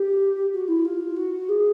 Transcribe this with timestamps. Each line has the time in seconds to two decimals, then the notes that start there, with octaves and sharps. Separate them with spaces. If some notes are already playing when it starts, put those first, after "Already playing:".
Already playing: G4
0.52 F#4
0.68 E4
0.85 F4
1.16 F#4
1.49 G#4